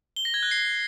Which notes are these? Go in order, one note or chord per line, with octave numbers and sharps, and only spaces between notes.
G7
A#6
G#6
F#6
C7